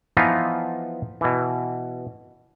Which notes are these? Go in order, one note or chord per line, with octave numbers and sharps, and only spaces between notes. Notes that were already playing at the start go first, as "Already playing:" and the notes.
E3 F3 B3 D#4 F4
B2 E3